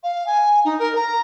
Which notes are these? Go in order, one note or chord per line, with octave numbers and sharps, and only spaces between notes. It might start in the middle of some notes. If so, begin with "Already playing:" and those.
F5
G#5
D#4
A#4
A#5